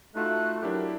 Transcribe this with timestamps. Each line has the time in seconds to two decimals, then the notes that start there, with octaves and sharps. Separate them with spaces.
0.15 A3 D#4 F4 F#4 F#6
0.63 F#3 D4 E4 G4 A#4